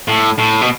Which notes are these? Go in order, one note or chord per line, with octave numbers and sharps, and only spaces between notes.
A2
A2
B2